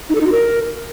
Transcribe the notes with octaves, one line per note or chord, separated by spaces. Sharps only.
D#4
A4
D#4
F#4
A#4